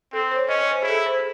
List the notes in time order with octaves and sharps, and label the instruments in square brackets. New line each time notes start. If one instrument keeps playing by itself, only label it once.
[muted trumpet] C4 [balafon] A4
[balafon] C5
C#5
[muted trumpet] C#4 [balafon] D#5
[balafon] C#5
C5
[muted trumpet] E4 [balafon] G#4
[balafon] A4
G#4
C5
G#4